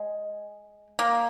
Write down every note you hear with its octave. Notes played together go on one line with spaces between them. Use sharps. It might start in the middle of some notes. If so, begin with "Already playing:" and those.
Already playing: G#3
A#3